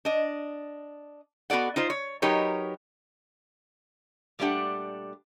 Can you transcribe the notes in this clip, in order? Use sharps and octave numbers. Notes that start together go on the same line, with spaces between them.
D4 D#5
B3 F#4 A4 D5 F#5
D#4 F4 C5
C#5
F#3 D#4 G4 A#4 B4 C#5
A#2 G3 A3 D4 G4 F#5